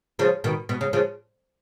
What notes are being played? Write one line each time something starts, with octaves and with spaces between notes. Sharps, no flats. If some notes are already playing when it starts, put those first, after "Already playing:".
C#3 F3
B2 D#3
B2
C#3
C#3 F3